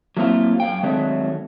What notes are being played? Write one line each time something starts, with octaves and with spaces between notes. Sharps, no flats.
F#3 A3 A#3 C4 E4 F4
F#2 F5 G5
D#3 F#3 G#3 A3 C4 D4